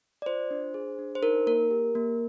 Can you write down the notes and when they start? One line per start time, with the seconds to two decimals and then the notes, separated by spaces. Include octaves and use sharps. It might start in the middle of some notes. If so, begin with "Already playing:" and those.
0.22 D5
0.26 F4 C5
0.51 D4
0.74 G#4
0.99 D4
1.15 C5
1.23 D#4 A#4
1.47 A#3 A#4
1.71 G4
1.95 A#3